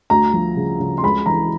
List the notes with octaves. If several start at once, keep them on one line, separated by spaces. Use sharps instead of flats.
D2 A#5
F3
C#3
C#3
C6
C#2 B5
E3 A#5